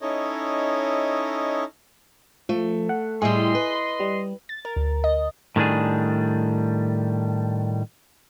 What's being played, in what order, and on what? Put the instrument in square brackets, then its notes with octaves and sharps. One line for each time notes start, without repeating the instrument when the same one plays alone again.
[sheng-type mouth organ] C#4 D#4 E4 A4 C#5 D#5
[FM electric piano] F3 [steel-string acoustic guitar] A3
[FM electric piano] F#5
[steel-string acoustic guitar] A2 G3 [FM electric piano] G#4 [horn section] D#5 C6
[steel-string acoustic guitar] B4
[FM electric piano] G3
[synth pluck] A6
A#4
D2
D#5
[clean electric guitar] A2 D#3 G3 D4 G#4